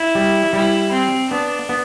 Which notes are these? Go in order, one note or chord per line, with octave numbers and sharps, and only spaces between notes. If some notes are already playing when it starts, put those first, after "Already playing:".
Already playing: E4
G3
G3 E4
C4
B3 D4
B3